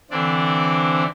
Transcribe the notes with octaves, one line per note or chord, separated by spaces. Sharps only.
D3 E3 C4 D4 D5